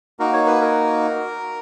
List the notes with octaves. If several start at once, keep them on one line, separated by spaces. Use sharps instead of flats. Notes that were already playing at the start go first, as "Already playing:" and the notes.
A#3 D#4 F#4 A#4
C#5
B4
A#4